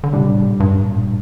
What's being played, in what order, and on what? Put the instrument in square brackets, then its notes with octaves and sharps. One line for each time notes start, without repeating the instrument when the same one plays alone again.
[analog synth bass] D3
[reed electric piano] A2 G3 D4 [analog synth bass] C3
[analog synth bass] A#2
G2
A#2